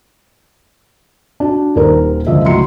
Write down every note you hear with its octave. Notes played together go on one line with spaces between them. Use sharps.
D4 F#4
D#1 D#2 A#2 A#4 C5 A#5
C#2 D3 F3 D#5 E5
C#2 A2 F#3 A#5 C6 C#7